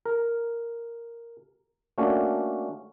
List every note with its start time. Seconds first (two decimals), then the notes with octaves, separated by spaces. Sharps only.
0.06 A#4
1.98 A3 A#3 C#4 D4 F#4